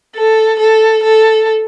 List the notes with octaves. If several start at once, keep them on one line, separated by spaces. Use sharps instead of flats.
A4
A4
A4